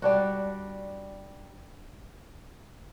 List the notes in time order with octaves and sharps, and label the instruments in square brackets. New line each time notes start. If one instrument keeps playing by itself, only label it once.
[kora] G3 D4 F#4